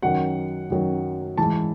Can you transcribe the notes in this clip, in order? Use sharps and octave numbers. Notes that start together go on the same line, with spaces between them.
F#2 D#3 F#3 F#5
F#2 D#3 F#3
G#2 E3 A5